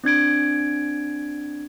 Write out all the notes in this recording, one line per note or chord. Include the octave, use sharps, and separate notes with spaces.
C4 D4 G#6 D7